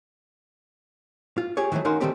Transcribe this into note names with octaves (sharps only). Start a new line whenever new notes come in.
F4
G4 G#4 C#5
D#3 E3 F#3 G#3 A3
C#4 D#4 F#4 A#4 F5 C6
D#3 F3 G3 A3 C4 G4